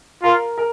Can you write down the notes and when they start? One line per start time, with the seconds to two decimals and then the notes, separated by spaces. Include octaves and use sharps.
0.23 F4 A#4
0.58 A#4